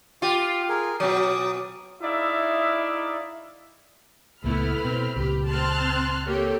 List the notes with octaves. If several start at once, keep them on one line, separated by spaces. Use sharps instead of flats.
F4 G4
G#4 A#4
B2 F#3 D6 D#6
D#4 E4 G#4 D5 E5 F5
C#2 A#2 A3 B3 E4 B4 B5 F6
B2 C4
C#2 A#2 G4
C4 A5 C6 F6 F#6
A#3 G4 A4 C#5